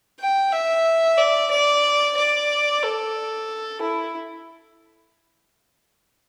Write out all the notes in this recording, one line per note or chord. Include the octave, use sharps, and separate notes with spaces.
G5
E5
D5
D5
D5
A4
E4